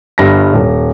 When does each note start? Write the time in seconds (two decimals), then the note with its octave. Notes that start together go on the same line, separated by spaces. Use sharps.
0.18 G1 G2 A#6
0.53 D#1